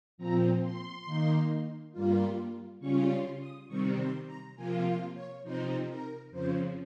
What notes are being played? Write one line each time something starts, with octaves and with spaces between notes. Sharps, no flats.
A#2 F3 C4 A#5
C6
D#3 A#3 D#4
G2 G3 A#3 F4
C#3 G3 C#4 F4 C#6
C6
D#6
C3 D#3 G3 C4 C#6
C6
A#5
C3 F3 A#3 F4 G#5
F5
C#5
C3 F3 C4 D#4 C5
A#4
F2 C#3 F3 C5